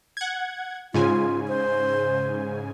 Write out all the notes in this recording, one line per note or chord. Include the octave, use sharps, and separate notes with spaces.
F#5 G#6
G#2 C#3 F4 G#5
C5